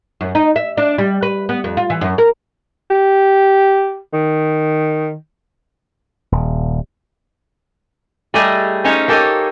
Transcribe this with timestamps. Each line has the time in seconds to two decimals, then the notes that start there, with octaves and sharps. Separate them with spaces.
0.21 F#2
0.35 D#4
0.56 E5
0.77 D4
0.98 G3
1.23 B4
1.49 B3
1.64 F2
1.77 F4
1.90 E3
2.01 F#2
2.18 A#4
2.90 G4
4.13 D#3
6.32 D#1
8.34 G3 A3 E4 G4 G#4 D#5
8.84 C#4 D#4 C5 C#5 F5
9.08 A#3 G4 A4 C5 C#5 G#5